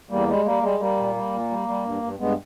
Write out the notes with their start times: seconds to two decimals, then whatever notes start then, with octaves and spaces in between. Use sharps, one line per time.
0.11 E2 G3 A#3
0.28 G3 G#3
0.45 G3 A#3
0.63 G3 G#3
0.80 G3 A#3
0.98 A#2
1.15 G3
1.33 A#2
1.50 G3
1.68 G3
1.85 G2
2.03 G2
2.19 G2 G#3 B3